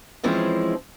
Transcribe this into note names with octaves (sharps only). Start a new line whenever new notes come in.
E3 F3 G#3 C4 C#4 E4